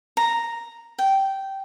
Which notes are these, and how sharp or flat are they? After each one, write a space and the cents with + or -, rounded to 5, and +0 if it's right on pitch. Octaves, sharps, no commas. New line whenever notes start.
A#5 -5
G5 -10